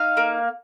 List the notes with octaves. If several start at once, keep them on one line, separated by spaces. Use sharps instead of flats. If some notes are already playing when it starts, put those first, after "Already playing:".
Already playing: D#4 F5
A#3